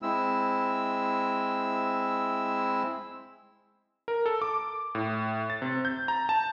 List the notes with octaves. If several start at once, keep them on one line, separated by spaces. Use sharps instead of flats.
G#3 C4 E4 E6
A#4
A4
D6
A2
A6
C3
G6
A#5
A5